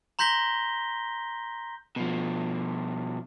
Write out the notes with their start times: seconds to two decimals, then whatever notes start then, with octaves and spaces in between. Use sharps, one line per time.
0.19 A#5 C6 G6 A#6 B6 G7
1.96 B2 F3